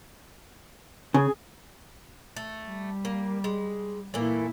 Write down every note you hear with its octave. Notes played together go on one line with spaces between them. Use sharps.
C#3 G#4
A3
G3
A#3
G#3
A#2 E3 A3 A#3 E4